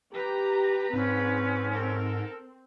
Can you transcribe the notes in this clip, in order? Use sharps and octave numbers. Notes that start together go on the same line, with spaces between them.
G4 B4 A#5
G#2 C4 C#4
A4 A#4